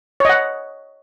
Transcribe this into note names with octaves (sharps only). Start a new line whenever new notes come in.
C#5 D#5 F#5